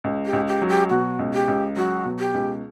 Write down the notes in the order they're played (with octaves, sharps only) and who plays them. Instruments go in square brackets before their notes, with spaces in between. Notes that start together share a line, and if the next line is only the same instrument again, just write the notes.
[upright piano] C#2
[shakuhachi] G4
[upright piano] C#2
[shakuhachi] G4
[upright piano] F#3
[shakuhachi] G4
[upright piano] B2 [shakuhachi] F#4
[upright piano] C#2
[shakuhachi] G4
[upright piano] C#2
[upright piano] F#3 [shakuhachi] F#4
[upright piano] B2
[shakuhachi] G4
[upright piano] C#2